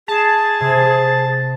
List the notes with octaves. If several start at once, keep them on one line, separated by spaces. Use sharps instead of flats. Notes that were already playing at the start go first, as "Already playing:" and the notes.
G#4 A5
C3